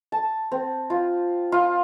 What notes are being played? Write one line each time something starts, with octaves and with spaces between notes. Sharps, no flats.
A5
C4
F4
F4